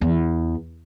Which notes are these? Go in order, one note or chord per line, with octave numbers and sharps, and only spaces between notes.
E2